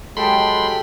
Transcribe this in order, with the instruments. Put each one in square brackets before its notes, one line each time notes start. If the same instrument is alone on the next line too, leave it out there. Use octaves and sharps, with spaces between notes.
[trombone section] F#3 G#3 [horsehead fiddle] G4 G5 [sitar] A4 [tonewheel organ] B5 C6